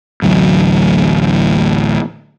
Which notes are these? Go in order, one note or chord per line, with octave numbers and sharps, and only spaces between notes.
A1 D2 F#3